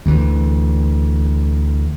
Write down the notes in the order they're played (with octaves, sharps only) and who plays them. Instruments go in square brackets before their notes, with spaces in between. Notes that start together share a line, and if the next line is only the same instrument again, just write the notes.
[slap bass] D2 E3